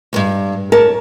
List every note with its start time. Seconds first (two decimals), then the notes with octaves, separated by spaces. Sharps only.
0.13 D2 G2
0.72 A#4 C#5 A5